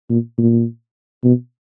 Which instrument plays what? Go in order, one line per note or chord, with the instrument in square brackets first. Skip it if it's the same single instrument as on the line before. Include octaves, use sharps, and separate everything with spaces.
[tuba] A#2
A#2
B2